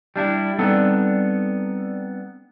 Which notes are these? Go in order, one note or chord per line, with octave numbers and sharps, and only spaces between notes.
G3 D4 E4
G3 B3 C4 D4 D#4 A4